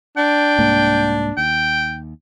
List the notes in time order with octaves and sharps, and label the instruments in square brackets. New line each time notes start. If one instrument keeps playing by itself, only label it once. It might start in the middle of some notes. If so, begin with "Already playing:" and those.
[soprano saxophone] D4 [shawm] G5
[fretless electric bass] C2 G#2 A#3
[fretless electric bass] D#2 [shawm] G5